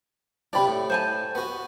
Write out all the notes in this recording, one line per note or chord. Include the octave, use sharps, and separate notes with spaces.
C3 C4 D4 D5 B5
A2
C5 G#5 A5
B3 F#4